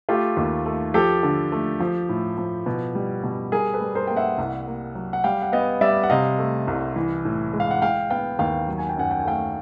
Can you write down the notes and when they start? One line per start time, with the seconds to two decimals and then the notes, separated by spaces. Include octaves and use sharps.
0.09 A3 F4 G4
0.37 D#2
0.66 A3
0.94 F3 G4 A4
1.23 D3
1.52 A3
1.80 F3
2.09 A2
2.38 F3
2.66 B2
2.95 G3
3.24 B2
3.52 G3 G#4 A#4
3.74 A4 B4
3.81 G3
3.95 A#4 C5
4.07 A#3 G5
4.17 E5 F#5
4.38 C2
4.67 A#3
4.95 F#3
5.13 F#5
5.24 G3 F5 G5
5.42 F#5
5.53 B3 D#5 F5
5.81 G3 D5 E5
6.04 F#5
6.10 C3 D#5 F5
6.39 A3
6.67 C2
6.96 E3
7.25 A2
7.53 G#3
7.60 F5
7.71 F#5
7.82 G#3 F5 G5
8.10 B3 F5 G5
8.39 D#2 F5 G5
8.68 F#3
8.78 G#5
8.89 G5
8.96 F#2 F#5 G#5
9.11 G5
9.20 G#5
9.25 A3 F5 G5